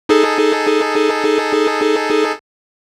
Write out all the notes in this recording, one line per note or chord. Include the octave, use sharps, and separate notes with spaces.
D#4 G#4 A4